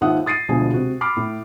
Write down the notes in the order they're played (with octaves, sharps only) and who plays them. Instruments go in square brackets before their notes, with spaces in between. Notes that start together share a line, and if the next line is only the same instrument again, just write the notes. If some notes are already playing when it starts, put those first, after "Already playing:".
[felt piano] D#2 G#2 F4 E5 F#5 D#6
D#6 A6 C7 D#7
D2 B2 F3 G#3 G#5
C3 F#4
B5 D6 F6 C7
A2